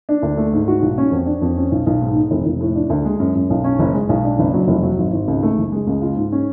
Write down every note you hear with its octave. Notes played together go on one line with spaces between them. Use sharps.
D4
D2
A3
G#2
F#4
B1
C#4
F2
D4
F2
C#4
B1
B1
G#2
G#2
F1
F1
A2
D4
D2
G#3
F#2
F#2
B1
C#4
F#1
G#3
B1
D4
F#1
F#3
F1
F#3
G#1
G#1
C#2
A3
F#1
G#3
C#2
F4
G#2
C#4